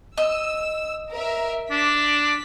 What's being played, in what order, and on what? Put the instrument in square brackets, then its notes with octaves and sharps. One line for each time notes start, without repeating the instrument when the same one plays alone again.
[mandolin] D#5 [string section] E6
[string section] A#4 E5
[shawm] D4 [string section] B6